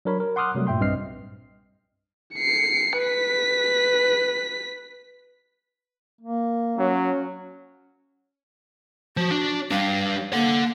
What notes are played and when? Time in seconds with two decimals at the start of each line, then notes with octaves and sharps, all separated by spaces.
0.05 F#3 D4 A#4 C#5 B5
0.20 A#4
0.36 F#5 C6 D6 D#6 F6 F#6
0.55 C3 F#3 G3 A3
0.67 G2 A#2 E5 G5 C6
0.80 B1 G2 C4 D#5 F6 C7
2.35 C7 C#7
2.99 B4 B6
6.21 A#3
6.78 F#3 C#4
9.17 F3 F#4
9.31 D4
9.71 G3 D4 F5
10.33 A#3 A4 F#5